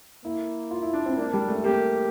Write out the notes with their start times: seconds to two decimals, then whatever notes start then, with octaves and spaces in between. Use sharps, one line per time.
0.24 A#3 E4
0.71 F4
0.82 E4
0.93 D4
1.06 C4
1.17 A#3 D4
1.33 G3
1.48 A3
1.63 A#3 G4